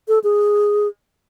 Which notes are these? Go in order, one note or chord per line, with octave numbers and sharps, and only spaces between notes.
A4
G#4